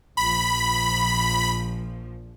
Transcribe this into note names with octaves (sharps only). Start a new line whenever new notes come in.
A#1 F3 B5